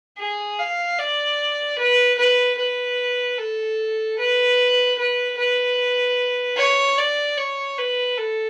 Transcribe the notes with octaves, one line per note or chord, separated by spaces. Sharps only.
G#4
F5
D5
B4
B4
B4
A4
B4
B4
B4
C#5
D5
C#5
B4
A4